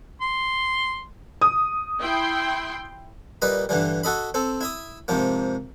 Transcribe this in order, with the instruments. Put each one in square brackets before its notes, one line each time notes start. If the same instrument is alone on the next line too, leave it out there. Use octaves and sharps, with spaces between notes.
[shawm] C6
[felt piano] D#6
[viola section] E4 G5 C6
[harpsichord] A#2 G3 B4 D#5 A#5
G2 D3 E3 G3
F#4 A4 D#5 B5
C4 A4
E4 E5 D#6
G#2 C3 F3 A#3